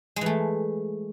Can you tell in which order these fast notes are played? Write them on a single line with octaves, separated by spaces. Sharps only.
G#3 E3 A3